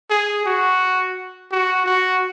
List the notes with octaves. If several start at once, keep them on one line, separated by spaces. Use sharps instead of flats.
G#4
F#4
F#4
F#4